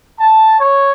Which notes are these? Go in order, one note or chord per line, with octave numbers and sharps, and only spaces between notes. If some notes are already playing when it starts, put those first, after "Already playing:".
A5
C#5